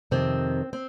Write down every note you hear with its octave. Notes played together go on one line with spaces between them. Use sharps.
F2 C3 D#3 C4
C4